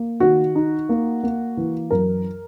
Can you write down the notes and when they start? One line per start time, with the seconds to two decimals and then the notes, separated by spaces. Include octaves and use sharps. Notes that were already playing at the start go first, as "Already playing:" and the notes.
Already playing: A#3
0.20 D#3 F#4
0.55 D#4
0.89 A#3
1.23 A#3
1.57 E3
1.91 F#2 A#4